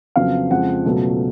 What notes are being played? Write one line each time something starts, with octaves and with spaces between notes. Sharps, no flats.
F2 C#3 F#3 B3 F5
F2 C#3 F3 G#3 F#5
C#2 B2 F#3 A3